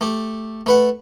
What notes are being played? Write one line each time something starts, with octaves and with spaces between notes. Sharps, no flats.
A3 G4
A3 B4 F#5